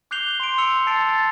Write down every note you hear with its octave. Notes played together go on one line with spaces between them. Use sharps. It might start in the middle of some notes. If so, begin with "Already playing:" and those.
D6 F#6 G6 C7 F7 G7
C6 D7
C6 E6 C#7 F7
A5 A6 C7 D7
A5 A6